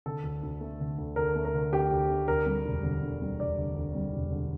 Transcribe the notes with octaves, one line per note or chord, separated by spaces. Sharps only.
D3 A4
D2
D2
A3
D3
D2
D2 A#4
A3
A#4
D3
D2 G4
D2
A3
D2 A#4
G3
E1
D3
D2
G3
E1 D5
D3
D2
G3
E1
D3